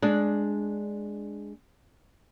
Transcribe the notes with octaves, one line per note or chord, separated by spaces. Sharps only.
G#3 D4